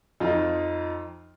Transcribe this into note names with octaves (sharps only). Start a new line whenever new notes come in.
F2 D#4 F4